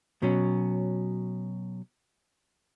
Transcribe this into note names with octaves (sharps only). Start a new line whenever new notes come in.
B2 F#3 C#4